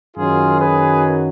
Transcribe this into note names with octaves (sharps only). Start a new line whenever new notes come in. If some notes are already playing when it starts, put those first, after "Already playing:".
F#2 D#3 F#3 F4 G#4
G#4 B4